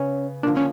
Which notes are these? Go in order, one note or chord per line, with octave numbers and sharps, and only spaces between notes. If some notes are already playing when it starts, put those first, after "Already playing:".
Already playing: C#3 B3 C#4
D3 F3 A#3 D4
C#4